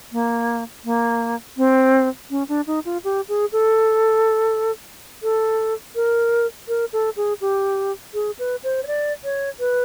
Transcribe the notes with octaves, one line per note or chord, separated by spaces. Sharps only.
A#3
A#3
C4
C#4
D4
D#4
F4
G4
G#4
A4
A4
A#4
A#4
A4
G#4
G4
G#4
B4
C5
C#5
D5
C#5
B4